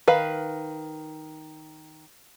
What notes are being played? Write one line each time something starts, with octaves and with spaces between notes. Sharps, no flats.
D#3 B4 F5